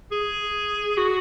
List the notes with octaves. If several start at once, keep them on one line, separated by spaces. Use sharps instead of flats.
G#4
F#4